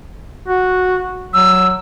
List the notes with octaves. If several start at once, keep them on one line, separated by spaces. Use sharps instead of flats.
F#4
F#3 E6